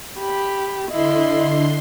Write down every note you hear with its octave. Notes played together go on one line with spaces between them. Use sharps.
G4 B5
D3 E4 D#5 C6